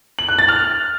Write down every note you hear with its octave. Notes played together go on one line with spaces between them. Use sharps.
F#7
F#6
A6
F6